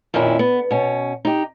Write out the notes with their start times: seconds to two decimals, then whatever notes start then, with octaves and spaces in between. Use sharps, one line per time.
0.14 F2 A#2 D#3 C#4 D4 E4
0.39 B3
0.71 B2 C#4
1.25 D#4 G4